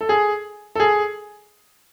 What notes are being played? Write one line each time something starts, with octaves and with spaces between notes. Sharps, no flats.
A4
G#4
A4
G#4